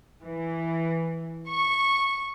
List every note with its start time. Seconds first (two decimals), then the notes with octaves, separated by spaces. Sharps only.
0.24 E3
1.48 C#6